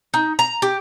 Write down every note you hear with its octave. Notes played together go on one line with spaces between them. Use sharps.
D#4
A#5
G4